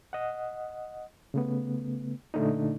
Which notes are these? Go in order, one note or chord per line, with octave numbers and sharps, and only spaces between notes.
D#5 F#5
C#3 A3 B3
A#2 D3 A3 D4 D#4